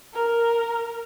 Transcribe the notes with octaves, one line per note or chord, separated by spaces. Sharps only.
A#4